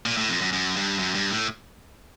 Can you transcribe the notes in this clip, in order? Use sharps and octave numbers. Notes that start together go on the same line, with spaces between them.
A#2
A2
F2
F#2
F#2
G2
F#2
G2
A2